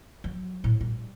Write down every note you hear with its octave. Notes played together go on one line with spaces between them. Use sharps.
F#3
A2
G3